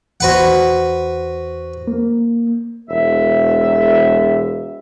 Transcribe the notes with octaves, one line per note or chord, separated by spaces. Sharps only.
E2 F#4 B4 C5 F#5
A#3
E1 E5